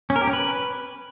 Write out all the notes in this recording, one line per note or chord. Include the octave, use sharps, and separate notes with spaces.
C#4
A#4
G4
C#4
B4